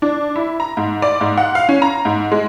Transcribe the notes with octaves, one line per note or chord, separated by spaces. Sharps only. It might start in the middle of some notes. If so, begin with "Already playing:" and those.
D4
E4
A#5
G#2
D5
G#2
F#5
F5
C#4
A#5
G#2
G#3